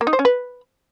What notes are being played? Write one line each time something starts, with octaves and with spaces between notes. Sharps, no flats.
A#3
D#4
C5
C#4
B4